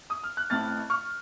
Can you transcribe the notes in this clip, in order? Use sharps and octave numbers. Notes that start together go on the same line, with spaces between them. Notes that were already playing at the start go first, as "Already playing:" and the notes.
D#6
F6
F#6
A1 A2 A3 C4 F6 A6
C#6 F6